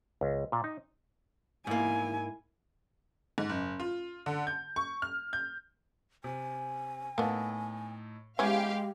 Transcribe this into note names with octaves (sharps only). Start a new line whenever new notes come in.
C#2
A#2
D#4
G#2 A#3 E4 G#5
G#2
F#1
F4
D3
G6
C#6
F6
G6
C3 G#5
A2 A#3 B3 D#4 A4
E3 G#3 B3 C#4 G4 F5 B5 G#6